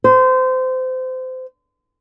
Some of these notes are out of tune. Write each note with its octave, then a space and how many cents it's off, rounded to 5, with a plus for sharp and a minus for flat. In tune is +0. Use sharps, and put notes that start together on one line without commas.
C5 -25